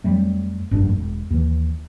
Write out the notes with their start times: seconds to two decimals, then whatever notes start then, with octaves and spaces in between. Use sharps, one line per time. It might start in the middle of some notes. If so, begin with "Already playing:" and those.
0.04 F2 F#3 G3 A3
0.71 F1 A#1 G2 D4
0.95 E1
1.30 D#2 E3